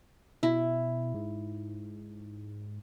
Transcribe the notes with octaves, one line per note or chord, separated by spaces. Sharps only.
B2 E4
G#2